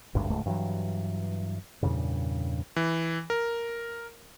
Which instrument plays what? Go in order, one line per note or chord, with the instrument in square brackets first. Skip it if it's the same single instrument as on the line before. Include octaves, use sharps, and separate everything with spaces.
[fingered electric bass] G#1 D2 G2
D1 C#2 G#2 A3
G2 E3 F#3
E2 G2 A#2 C#3
[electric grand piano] E3
A#4